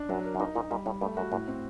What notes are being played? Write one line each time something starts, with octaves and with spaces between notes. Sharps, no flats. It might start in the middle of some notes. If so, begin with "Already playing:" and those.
Already playing: D4
F#2 F#3
A#4
F#2
G2 D#4
A#2 D#4
A#2 G3
A2 G3
G2 A3
F#2 F#4
F#2 A2
C4